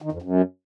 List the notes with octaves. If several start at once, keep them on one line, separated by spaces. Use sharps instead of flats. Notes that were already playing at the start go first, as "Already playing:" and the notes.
D#3
F2
F#2